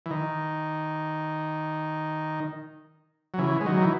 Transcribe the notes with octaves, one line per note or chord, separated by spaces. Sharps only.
E3
D#3
F#3
C#3 E3
G#3
D#3 F#3
E3